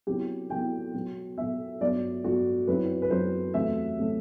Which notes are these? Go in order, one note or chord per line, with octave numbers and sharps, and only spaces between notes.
C3 F#3 B3 E4 G4
C3 F#3 B3 E4 G5
B2 F#3 B3
B2 F#3 B3 E5
G2 F#3 B3 D5
G2 F#3 B3 F#4
F#2 F#3 C4 E4 B4
B4
F#2 F#3 C4 E4 C5
E2 C3 F#3 A3 E5
C3 F#3 A3